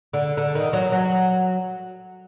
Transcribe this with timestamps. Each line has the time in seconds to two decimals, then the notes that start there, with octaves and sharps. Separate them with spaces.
0.13 D3
0.37 D3
0.55 D#3
0.73 F#3
0.92 F#3